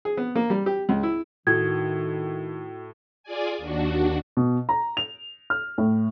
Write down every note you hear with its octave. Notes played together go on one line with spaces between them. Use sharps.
G#4
B3
A#3
G3
G4
C#2
E4
A2 D#3 F#4 D#6 G#6
F4 G#4 D5 G#5
D#2 D4 F#4
B2
A#5
F7
F6
A2